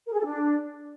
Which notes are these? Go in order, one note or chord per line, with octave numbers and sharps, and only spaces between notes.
A#4
G#4
A4
D4